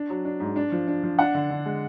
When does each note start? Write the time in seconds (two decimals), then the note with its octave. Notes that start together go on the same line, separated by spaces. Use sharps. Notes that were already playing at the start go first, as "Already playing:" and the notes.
Already playing: D4
0.10 F#3
0.25 D4
0.40 G#2
0.56 D4
0.72 F3
0.87 D4
1.03 F3
1.19 D4 F#5
1.35 D3
1.50 D3
1.65 G#3